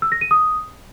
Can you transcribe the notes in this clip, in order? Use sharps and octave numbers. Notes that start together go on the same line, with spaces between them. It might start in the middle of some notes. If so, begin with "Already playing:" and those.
E6
A#6
D#7
D#6